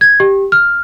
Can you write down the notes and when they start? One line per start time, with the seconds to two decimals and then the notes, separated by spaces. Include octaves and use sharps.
0.01 G#6
0.20 G4
0.52 F6